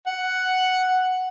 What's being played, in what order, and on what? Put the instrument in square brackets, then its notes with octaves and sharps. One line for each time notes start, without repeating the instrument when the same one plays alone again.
[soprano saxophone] F#5